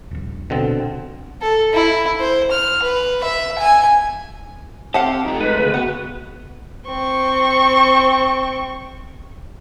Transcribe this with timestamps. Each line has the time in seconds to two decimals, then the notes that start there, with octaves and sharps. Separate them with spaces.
0.11 D#1 A#1
0.50 B2 D3 C4
1.42 A4
1.73 E4
2.20 C5
2.51 F6
2.83 B4
3.23 E5
3.58 G#5
4.94 C4 G4 F5 F#5 A5
5.25 F2 A3 D#4
5.41 G#3 B4
5.60 D2 C#3
5.74 B3 F#4 F#5
6.88 C4 C#6